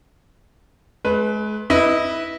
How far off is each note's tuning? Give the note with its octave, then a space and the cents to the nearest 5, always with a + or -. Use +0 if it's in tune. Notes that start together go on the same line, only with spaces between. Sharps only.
G#3 +40 B4 +0
E4 -15 B4 +0 D#5 +0